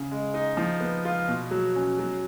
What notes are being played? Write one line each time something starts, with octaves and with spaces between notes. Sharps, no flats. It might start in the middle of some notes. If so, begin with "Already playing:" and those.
Already playing: C#3
G#3
D#4
F3
B3
F4
B2
F#3
C#4
F#3